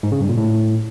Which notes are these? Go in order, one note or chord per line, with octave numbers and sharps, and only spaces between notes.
G#2
C#3
G2
A#2
A2